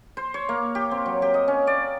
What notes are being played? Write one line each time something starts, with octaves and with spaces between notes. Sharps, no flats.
C5
C#5
A#3
G4
C4
F#3
G4
D#5
C#4
D5